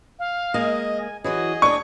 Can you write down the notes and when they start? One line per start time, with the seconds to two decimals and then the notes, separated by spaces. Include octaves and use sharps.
0.19 F5
0.54 G#3 A#3 G#4 D#5
1.00 G#5
1.24 E3 F#3 F#4 G#4 D#5
1.62 D4 C#5 C#6